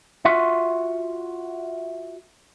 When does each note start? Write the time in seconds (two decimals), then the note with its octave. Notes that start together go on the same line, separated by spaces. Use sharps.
0.25 F4 F#4 E5 F#5